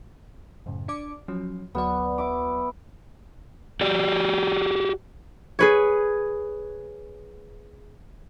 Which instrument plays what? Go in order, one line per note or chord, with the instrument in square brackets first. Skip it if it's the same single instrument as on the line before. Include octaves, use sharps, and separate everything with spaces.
[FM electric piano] F#2 A2 C#3
D4 D5 D6
F3 F#3 C#4
[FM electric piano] D2 F#3 D5 [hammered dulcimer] B3
[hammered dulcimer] E4 D6
[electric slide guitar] F#4 G4 D5
[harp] G#4 B4 C#5